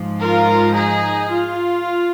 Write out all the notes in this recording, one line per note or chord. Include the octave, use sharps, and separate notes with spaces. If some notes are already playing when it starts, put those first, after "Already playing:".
Already playing: G#2 F3
F4 A#4
D#4 G#4
F4